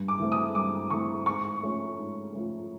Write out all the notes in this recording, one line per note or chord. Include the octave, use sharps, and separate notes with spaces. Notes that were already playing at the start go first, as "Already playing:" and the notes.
Already playing: G2
D6
E3 A3 C4
D#6
G2 D6
E3 A3 C4 C#6
G#2 C#6
F3 A3 C#4
G#2
F3 A3 C#4